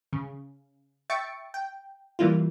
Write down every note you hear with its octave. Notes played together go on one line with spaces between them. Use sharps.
C#3
E5 G5 C#6 A6 C#7 D7
G5
E3 G3 A#3 E4 F4